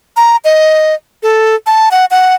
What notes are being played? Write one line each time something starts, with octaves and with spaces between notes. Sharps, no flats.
A#5
D#5
A4
A5
F#5
F#5